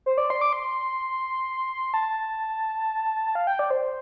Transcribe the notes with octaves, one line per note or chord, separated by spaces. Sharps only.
C5
D5
C6
D6
C6
A5
F5
G5
D5
C5